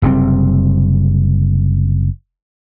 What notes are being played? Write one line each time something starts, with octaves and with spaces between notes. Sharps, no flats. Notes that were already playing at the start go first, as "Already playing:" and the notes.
F#1 C3 G3 C4